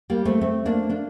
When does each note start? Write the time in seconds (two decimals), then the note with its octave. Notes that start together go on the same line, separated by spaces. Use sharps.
0.10 G3 A#3
0.25 A3 C4
0.41 A3 C4
0.65 A#3 D4
0.90 A#3 D4